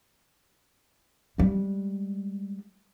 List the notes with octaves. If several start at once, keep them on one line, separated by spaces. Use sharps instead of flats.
G3 G#3